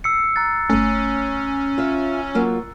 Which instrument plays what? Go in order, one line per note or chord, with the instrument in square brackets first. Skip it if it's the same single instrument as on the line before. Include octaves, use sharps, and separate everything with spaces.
[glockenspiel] E6 C7 C#7
A#5 F#6 A6
[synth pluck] G1 A3 [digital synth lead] C#4
[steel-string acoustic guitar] F4 E5
F#3 A#3 F4